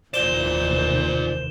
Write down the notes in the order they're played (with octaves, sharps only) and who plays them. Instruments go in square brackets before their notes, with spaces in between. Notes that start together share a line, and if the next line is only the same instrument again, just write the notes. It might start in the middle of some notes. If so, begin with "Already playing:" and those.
[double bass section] F1 D#2 E3 [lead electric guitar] F4 D5 [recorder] C5 [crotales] E7 G7